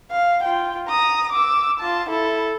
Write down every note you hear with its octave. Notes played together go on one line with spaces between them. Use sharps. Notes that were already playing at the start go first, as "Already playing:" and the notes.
F5
F4 G5
A#5 D#6
D6 E6
F4 A5
E4 A4